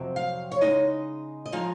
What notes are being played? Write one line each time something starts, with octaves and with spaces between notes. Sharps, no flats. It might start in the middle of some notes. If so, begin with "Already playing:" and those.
Already playing: F2 C3 F#3 C4
F5
C#5
C#3 G#3 D#4 D#5
D#5
F3 G#3 D#4 F5